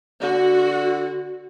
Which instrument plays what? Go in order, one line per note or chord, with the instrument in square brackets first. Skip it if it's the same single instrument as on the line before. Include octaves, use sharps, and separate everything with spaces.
[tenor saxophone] D3 [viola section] F#4